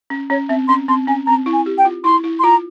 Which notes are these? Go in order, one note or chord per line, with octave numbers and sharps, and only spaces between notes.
C#4
C#4 C#5
C4 E5
C#4 C6
C4 C6
C#4 G#5
C4 A#5
E4
G#5
G4
G5
F4
E4 C6
E4
C6
F4 A#5